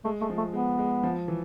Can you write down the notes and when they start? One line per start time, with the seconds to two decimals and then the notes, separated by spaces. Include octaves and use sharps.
0.05 G#3 A3
0.21 G#3 A3
0.30 F3
0.38 A3
0.53 G#3 B3
0.79 G#3
1.03 F3
1.28 E3